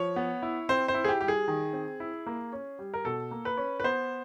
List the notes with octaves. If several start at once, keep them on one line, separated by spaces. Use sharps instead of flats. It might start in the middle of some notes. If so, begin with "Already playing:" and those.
Already playing: F3 C#5
B3
E4
C4 C5
C5
E4
G#4
G4
G3 G4
G#4
D#3
C4
E4
A#3
C#4
G3
A#4
B2 A4
A#3
B4
C#4
B4
B3 C5